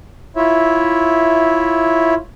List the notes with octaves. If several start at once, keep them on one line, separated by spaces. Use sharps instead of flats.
E4 F4 C#5 E5